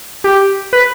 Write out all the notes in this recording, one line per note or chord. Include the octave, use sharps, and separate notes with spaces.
G4
B4